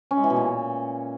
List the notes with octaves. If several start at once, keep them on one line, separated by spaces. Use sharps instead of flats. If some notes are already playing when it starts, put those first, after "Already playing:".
C#4
G#3
E3
B2
A#2